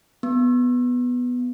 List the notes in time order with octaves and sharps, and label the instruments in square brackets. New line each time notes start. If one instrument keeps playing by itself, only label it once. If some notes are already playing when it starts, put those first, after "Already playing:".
[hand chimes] B3